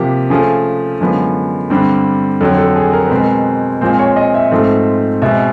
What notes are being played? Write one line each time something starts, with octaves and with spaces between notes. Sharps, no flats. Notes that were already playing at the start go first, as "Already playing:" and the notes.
Already playing: C3 F3 A#3 G4
C#3 F3 A3 G#4
F#2 D3 F3 G#3 B3
G2 D3 G3 C4
F2 D3 F#3 A4
A4
G#4
A#4
B2 G#3 C4 B4
A#4
A#2 F3 G#3 C4 C5
C#5
D#5
E5
G#2 F3 A3 C4
B2 G#3 C4 E5